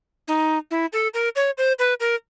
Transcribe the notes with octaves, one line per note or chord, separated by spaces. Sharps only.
D#4
E4
A4
A#4
C#5
C5
B4
A#4